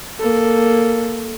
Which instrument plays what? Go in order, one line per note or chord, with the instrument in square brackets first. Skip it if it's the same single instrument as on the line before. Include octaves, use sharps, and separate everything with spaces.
[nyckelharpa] A#3 A4